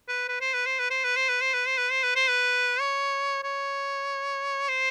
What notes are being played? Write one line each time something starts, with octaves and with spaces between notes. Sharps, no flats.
B4
B4
C5
B4
C5
B4
C5
B4
C5
B4
C5
B4
C5
B4
C5
B4
C5
B4
C#5
C#5
C5